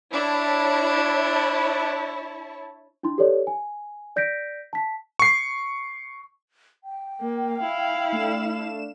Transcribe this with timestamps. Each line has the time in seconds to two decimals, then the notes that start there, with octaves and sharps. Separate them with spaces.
0.13 D4 E4 C#5 A5
3.03 D4 E4 C6
3.18 G4 A4 B4 C#5 D5
3.47 G#5
4.16 D5 G6 A#6 B6 D7
4.73 A5 B6
5.19 C#6 C7
6.84 G5
7.21 A#3
7.60 E4 F5
8.12 A3 D4 E7